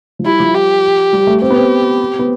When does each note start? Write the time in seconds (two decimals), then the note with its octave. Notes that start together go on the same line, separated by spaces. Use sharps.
0.19 F3
0.25 G3 E4
0.40 F3
0.54 G4
1.13 G3
1.27 A3
1.42 C4 G4
1.51 B3
1.56 C4
2.19 B3